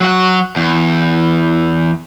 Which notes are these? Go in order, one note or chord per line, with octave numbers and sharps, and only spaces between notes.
F#3 F#5
E2